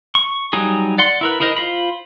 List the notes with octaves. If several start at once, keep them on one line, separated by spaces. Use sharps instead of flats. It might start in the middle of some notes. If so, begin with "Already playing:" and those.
C#6
F#3 G3 D#4 G#4
D5 F#5 C6
E4 A#4 B4
E4 G#4 A#4 C5 D#5
F4 C5 B5